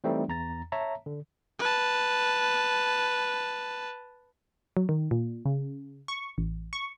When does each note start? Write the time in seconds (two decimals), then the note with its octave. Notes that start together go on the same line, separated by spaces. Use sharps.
0.04 E3 G3 A3 C4 D#4
0.28 E2 A#5 A6
0.72 C#5 E5 A5 A#5
1.06 D3
1.59 B4 A5
4.77 F#3
4.89 D#3
5.11 A#2
5.45 C#3
6.08 C#6
6.38 A1
6.73 C#6